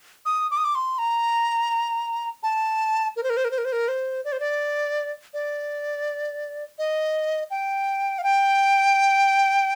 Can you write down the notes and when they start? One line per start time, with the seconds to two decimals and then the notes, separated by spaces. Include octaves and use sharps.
0.26 D#6
0.51 D6
0.57 D#6
0.64 D6
0.75 C6
0.98 A#5
2.43 A5
3.16 A#4
3.23 C5
3.30 A#4
3.37 C5
3.45 A#4
3.51 C5
3.58 A#4
3.65 C5
3.72 A#4
3.88 C5
4.25 D5
4.32 C5
4.40 D5
5.34 D5
6.79 D#5
7.50 G5
8.19 F5
8.24 G5